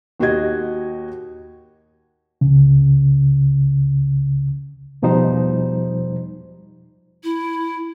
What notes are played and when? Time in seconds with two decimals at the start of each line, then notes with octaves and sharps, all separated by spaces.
0.20 D#2 F#4 G4 D#5 G#6
2.41 C#2 C#3
5.02 E2 B2 F3 G3 D#4 C5
7.23 E4